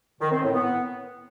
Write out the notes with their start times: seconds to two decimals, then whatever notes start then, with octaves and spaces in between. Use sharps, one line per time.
0.21 D#3
0.32 C4
0.43 A2
0.54 B3